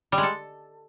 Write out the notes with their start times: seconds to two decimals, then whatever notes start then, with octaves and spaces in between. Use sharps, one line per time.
0.12 G3
0.18 G#3
0.23 A4